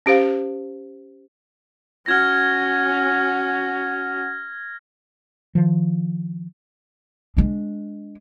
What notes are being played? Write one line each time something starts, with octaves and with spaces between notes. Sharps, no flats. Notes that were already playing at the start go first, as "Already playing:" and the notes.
C#4 G4 C5 F5
C#4 F#4 F6 G#6 A#6
D#3 F3
G#3 D4